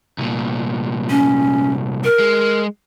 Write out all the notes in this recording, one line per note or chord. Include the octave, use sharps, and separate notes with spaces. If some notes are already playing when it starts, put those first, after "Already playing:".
C2 A#2
C#4
A#4
G#3